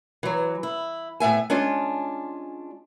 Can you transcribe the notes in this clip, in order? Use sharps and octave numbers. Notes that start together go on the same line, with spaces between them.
E3 F#3
E4
A2 B3 E5 G#5
G#3 C#4 D4 F4